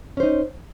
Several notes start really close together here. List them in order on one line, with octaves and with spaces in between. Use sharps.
C#4 C5 D#4